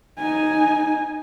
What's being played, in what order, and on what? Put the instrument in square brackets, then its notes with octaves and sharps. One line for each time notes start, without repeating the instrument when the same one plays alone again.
[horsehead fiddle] D#4 G#5